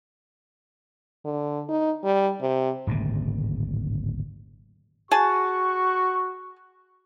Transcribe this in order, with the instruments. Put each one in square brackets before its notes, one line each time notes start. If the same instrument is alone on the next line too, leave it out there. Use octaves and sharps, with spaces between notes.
[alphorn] D3
D#4
G3
C3
[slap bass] D1 G#1 A#2 C#3
[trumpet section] F#4 C#6 [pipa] G#4 G#5 A5